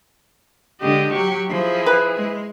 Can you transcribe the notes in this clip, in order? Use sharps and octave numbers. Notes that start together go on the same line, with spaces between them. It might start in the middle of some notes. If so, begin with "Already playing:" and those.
D3 G#3 G4 D#5
F#3 G4 C#6
F3 E4 G#4
B4
G#3